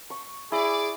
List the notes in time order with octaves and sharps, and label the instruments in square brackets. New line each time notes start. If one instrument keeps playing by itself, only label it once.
[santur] C#6
[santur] E4 [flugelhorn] G#4 [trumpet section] D5 D6